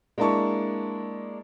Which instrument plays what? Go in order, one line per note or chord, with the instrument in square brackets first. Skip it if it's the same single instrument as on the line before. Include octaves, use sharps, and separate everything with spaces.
[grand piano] G#3 A#3 D4 E4 A5 C#6